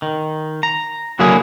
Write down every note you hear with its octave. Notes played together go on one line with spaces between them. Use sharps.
D#3
A#5
D3 F#3 A#3 E4 G#4